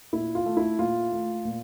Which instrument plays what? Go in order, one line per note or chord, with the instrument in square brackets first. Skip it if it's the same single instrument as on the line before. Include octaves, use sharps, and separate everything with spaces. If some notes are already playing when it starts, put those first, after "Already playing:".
[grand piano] A#2 E4
F4
A3
E4
A#2 F4
A3
A#2